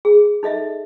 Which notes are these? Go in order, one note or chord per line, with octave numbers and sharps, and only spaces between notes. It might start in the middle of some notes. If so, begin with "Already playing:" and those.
G#4
D#4 A4 D#5 E5